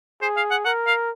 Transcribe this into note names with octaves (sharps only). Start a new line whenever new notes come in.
G#4 C5
F5
F#5
A#4 F#5
F5